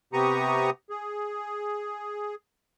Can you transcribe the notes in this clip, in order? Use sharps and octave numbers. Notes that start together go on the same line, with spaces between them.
C3 B3 G4 A#5 C#6 D#6
G#4